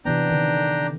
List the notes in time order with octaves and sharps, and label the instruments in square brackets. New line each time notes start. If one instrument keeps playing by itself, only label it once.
[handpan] C3 E3 B3 [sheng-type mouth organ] D4 G5 A#5
[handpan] D3 D#3